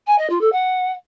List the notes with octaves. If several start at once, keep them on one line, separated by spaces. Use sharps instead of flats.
G#5
D#5
F4
A4
F#5